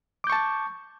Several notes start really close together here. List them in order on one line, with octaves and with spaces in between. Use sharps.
D6 G6 C#6 A5